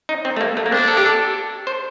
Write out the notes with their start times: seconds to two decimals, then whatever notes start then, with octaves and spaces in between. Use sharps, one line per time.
0.09 D#4
0.25 C4
0.36 A3
0.41 A#3
0.57 A3
0.66 A#3
0.72 C4 D4
0.88 A4
0.97 G4
1.06 A4
1.67 C5